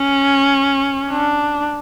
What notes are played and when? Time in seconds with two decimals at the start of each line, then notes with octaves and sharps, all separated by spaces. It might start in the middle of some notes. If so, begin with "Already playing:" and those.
Already playing: C#4
1.10 D4